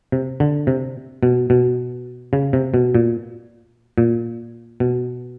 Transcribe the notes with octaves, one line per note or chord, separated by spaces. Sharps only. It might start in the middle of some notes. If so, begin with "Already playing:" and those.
C3
D3
C3
B2
B2
C#3
C3
B2
A#2
A#2
B2